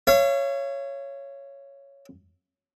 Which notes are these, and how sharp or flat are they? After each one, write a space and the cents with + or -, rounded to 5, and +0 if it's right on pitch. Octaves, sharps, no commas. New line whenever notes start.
C#5 +0 F5 -45